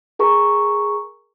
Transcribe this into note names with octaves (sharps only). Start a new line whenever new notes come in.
G#4 A#4 A#5 C#6